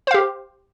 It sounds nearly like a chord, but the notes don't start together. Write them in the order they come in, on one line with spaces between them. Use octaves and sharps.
C5 F5 G4